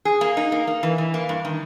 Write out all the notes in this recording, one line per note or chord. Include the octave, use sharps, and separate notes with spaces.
G#4
A#3
D#4
A#3
A#3
E3
E3
A#3
G2
D#3